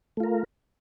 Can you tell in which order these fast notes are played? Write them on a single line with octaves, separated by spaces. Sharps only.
A3 F4 A#4